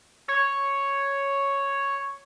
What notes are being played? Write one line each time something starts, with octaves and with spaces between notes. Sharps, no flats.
C#5